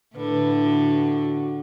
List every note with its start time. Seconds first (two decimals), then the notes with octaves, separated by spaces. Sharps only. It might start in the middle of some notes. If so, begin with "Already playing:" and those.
0.16 A2 D3 B4
0.63 F#4